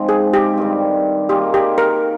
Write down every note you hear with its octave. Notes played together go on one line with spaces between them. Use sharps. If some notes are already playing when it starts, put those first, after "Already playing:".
Already playing: G#2 F3 G#3 C4
G#4
G4
G2 D#3 G3
D#3 A#3 F4 G4 G#4
G4
A#4